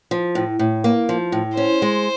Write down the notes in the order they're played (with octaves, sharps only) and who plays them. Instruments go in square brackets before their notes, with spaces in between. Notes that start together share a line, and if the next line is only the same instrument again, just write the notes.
[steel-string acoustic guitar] F3
A2
A2
A#3
F3
A2
[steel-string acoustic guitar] C#4 [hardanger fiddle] C5
[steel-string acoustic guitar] G#3